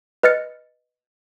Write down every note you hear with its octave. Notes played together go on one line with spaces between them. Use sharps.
B4 D#5 F6 A6 C#7